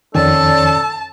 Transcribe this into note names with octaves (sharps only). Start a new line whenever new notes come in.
F2 D#3 C#4 A4 D5 A5